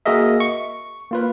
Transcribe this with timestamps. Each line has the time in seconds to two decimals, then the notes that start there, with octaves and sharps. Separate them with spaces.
0.06 A#3 F#4 G#4 A#4 D#5 E5
0.40 C#6
1.11 A#3 F4 B4